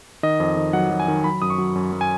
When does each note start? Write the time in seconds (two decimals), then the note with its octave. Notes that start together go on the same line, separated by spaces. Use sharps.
0.23 D#3 D#5
0.40 F2
0.57 D#3
0.73 F#3 F#5
0.91 F#3
1.00 G#5
1.08 D#3
1.24 F#3 B5
1.42 F#2 D#6
1.50 C#6
1.58 F#3
1.76 F#2
1.93 F#2
2.01 G#5